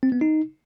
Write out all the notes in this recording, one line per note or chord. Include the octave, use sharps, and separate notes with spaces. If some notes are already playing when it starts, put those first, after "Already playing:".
C4
B3
D#4